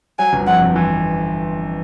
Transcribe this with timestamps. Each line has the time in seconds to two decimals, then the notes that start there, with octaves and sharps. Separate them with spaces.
0.19 F#3 G#5
0.33 G1
0.47 F2 F#5
0.61 G1
0.76 E3